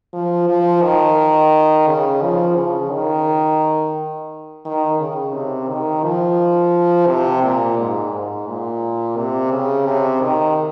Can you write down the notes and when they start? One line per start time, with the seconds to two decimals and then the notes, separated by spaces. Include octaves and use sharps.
0.13 F3
0.48 F3
0.82 D#3
1.87 C#3
2.22 F3
2.56 C#3
2.91 D#3
4.65 D#3
5.00 C#3
5.34 C3
5.69 D#3
6.04 F3
7.07 C3
7.43 A#2
7.78 G#2
8.12 G#2
8.47 A#2
9.17 C3
9.51 C#3
9.86 C3
10.21 D#3